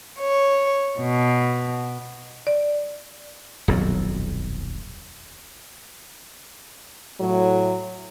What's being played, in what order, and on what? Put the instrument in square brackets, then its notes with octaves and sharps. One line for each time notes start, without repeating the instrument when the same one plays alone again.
[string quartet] C#5
B2
[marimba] D5
[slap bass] D#1 B1 F2 F#3
[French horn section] A2 F#3